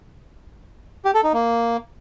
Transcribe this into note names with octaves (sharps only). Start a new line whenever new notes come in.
G4
A4
D#4
A#3